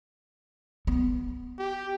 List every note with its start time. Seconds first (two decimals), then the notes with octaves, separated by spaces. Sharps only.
0.87 B3
1.59 G4